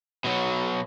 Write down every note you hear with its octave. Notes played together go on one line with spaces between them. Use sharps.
B2 F#3